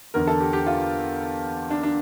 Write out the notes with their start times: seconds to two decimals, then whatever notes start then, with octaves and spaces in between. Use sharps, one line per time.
0.14 E2 D3 A#4
0.27 A4
0.40 G4
0.53 G4
0.66 F4
1.70 D4
1.83 D4